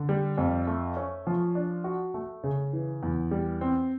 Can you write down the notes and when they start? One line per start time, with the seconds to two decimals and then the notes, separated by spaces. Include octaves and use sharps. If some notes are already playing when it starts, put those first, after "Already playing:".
Already playing: D3
0.09 G3
0.38 F2
0.67 A3
0.97 C#4
1.27 F3
1.55 D4
1.84 F#4
2.14 A3
2.43 C#3
2.73 E3
3.03 E2
3.31 G3
3.61 C4